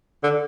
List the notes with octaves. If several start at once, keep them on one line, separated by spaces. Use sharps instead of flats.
D3